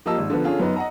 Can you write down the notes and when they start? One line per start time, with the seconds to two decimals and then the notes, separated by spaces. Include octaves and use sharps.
0.06 F3 A#3 G4 D#5 A5 E6
0.18 G#1
0.30 D3 F3 B3
0.44 D3 C#4 F4 G#4
0.59 F#2 B3 D#4
0.76 D#5 F#5 A#5